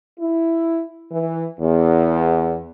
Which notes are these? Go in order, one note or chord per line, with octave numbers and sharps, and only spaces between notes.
E4
E3
E2